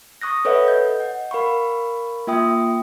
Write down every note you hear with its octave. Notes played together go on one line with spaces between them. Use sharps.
C#6 D#6 F#6 A#6
A4 B4 C#5 D#5 E5 F#5
D#5 G6
F#5
A#4 F5 B5 C#6
A#3 F4 E5 G5 D#6